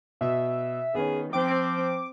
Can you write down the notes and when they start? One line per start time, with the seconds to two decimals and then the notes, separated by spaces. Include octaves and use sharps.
0.21 B2 E5
0.95 D#3 B3 C#4 G#4
1.33 F3 C4 G5 D6